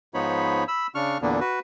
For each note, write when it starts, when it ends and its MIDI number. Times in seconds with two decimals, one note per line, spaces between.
0.14 0.64 44
0.14 0.64 53
0.14 0.64 59
0.14 0.64 63
0.14 0.64 73
0.14 0.64 83
0.68 0.87 83
0.68 0.87 88
0.95 1.18 49
0.95 1.18 62
0.95 1.18 85
0.95 1.18 89
1.22 1.40 40
1.22 1.40 46
1.22 1.40 50
1.22 1.40 58
1.22 1.40 59
1.22 1.40 62
1.40 1.59 66
1.40 1.59 71